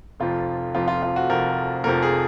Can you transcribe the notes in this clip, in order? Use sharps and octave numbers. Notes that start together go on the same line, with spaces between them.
F1 F2 F3 F4
F1 F2 F3 F4
F4
F4
F#4
F1 F2 F3 A#4
F1 F2 F3 A#4
G#4